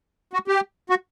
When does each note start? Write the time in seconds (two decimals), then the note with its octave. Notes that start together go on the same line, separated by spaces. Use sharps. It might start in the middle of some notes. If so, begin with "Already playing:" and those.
0.33 F#4
0.48 G4
0.90 F#4